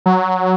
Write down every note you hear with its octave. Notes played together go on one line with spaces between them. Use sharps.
F#3